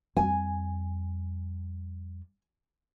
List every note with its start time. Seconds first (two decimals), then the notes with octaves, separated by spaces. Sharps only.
0.17 F2 G3 G#5